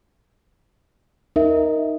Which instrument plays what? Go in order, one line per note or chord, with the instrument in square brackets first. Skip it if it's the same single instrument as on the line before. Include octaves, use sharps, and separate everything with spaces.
[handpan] D#4 [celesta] A#4 E5